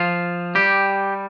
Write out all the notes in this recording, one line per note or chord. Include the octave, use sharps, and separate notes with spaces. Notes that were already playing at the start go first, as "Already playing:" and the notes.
Already playing: F3 F4
G3 G4